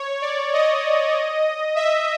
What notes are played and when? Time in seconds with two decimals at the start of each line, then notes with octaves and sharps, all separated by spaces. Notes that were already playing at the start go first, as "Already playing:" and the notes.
Already playing: C#5
0.22 D5
0.53 D#5
1.76 E5